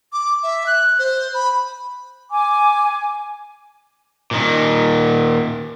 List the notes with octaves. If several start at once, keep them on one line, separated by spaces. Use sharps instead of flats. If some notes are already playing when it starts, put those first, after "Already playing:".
D6
E5
F#6
C5
B5
G#5 D6
A#2 D#3